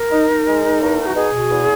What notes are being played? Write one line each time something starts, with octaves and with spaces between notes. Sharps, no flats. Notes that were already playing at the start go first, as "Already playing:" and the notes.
Already playing: A#4
D#4
D#4
G#3
D#4
E2
D#4
F#4
B2 G#4
B2
E2